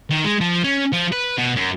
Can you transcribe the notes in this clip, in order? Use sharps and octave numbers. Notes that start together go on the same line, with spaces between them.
D#3
G#3
F3
C#4
F3
B4
B2
F#2